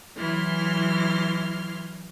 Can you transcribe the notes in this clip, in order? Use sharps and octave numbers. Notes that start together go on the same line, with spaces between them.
E3 F#3 E4 C6 F6